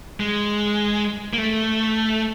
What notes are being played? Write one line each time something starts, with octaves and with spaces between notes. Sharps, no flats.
G#3
A#3
A3